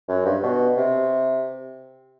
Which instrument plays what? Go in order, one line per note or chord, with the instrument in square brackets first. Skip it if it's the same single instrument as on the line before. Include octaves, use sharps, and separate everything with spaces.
[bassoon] F#2
G2
B2
C3